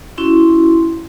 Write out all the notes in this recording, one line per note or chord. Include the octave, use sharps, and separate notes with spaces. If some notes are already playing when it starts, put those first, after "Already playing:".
C#4 E4 F#4 C6